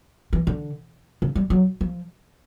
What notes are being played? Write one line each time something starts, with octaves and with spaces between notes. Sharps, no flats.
E3
D3
C#3
G3
F#3
F3